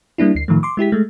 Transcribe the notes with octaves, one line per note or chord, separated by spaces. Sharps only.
G3 A#3 D4 E4
D2 C7
A2 D#3 F3 A3
C6 D6
G#3 E4 G4 B6
G#3 A3